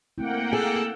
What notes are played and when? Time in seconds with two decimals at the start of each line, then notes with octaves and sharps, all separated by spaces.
0.18 A3 A#3 C4 E4 F#5 G5
0.53 G#4 A4 F5